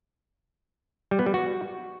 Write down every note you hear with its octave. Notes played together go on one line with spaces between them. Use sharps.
G3
B3
G3
F#4